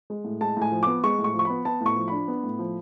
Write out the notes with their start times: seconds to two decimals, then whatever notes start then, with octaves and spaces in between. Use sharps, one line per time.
0.10 G#3
0.25 A2
0.41 G#3 A5
0.57 A2 G#5
0.72 F3
0.83 B3 D6
1.04 G#3 C#6
1.19 A2
1.24 C#6
1.34 F3
1.39 C#6
1.45 B3 B5
1.65 B3 A5
1.81 A2 C#6
1.96 F3
2.08 D4 B5
2.28 B3
2.44 A2
2.59 F3